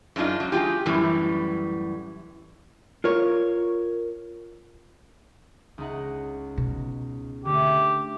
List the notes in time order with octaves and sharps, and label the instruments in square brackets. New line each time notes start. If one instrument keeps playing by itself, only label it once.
[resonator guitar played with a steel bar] F#2 G#3 D4 D#4 F4
F#3
G#3 A#3 F4 G4
F#2 A2 E3 G3
[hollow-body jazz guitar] F4 A#4 C#5
[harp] C#2 D#4 F#5
[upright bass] B2
[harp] D3 A3 [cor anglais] G4